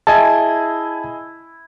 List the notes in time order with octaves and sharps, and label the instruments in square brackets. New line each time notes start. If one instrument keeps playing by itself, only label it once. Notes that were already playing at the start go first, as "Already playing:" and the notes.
[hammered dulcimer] E4 [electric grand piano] G#4 D#5 G#5 [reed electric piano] A5